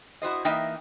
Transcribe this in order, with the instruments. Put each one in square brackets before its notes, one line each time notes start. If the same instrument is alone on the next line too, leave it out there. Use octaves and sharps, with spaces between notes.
[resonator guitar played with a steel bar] E4 F#4 C5 D#5
E3 A#3 D#4 E5 G5